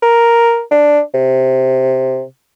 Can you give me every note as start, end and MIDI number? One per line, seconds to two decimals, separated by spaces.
0.03 0.61 70
0.71 1.01 62
1.14 2.22 48